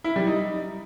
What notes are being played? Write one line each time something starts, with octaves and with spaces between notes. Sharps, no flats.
E4
G3
D#4